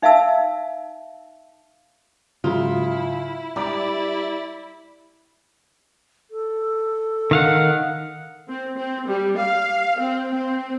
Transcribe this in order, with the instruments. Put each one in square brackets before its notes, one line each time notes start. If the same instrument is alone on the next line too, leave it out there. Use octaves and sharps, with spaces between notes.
[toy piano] D#4 E5 F5 A5 E6
[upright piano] G#2 C#3 F#3 [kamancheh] E4 [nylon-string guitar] F4
[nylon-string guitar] G3 [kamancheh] E4 D5 [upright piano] A#5 B5 D6
[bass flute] A4
[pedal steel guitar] D#3 F5 F#5
[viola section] C4
C4
G3
F5
C4
C4